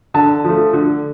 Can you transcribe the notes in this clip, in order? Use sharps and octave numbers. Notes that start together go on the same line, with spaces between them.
D3 A5
F3 A3
D3